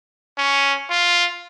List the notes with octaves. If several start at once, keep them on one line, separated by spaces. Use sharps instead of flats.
C#4
F4